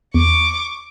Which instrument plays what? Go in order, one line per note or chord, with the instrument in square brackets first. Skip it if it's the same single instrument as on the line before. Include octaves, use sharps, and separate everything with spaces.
[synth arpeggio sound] E2 [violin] C#6 D6